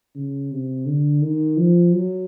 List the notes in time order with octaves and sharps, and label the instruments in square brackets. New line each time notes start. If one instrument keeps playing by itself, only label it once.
[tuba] C#3
C3
D3
D#3
F3
F#3